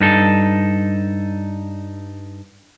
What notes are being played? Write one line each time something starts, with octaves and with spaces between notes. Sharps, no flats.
G2 D#4 A4